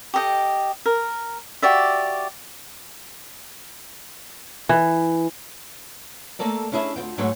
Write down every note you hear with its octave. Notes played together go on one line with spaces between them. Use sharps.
G4 A4 D#5 G5
A#4
F#4 G4 D5 E5
E3
A3 A#3 A4 A#4 D5
C#4 D4 E4 G#4 A4 E5
D2 G#2 F4 G5
G#2 F#3 G#3 A3 C#5 G5